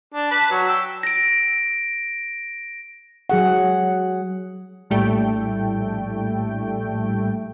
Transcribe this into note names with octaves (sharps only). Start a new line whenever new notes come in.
D4
B4 A5 B5
F#3
G5 E6
A#6 D7
F#3 G#4 F#5
A#1 A2 G3 A3 G5